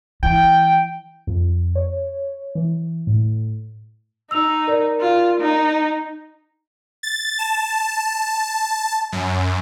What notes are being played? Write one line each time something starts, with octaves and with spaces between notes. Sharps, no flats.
E3 G5
F2
C#5
E3
A2
D#4 E6 F7
A#4 D5
F4
D#4
A6
A5
F#2